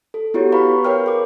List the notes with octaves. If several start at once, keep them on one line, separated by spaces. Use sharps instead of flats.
A4
B3 E4 F#4 G4 C#5
B4 F5 A#5 B5 C#6
A#4 B4 C#5 G5 F6
G#4 D6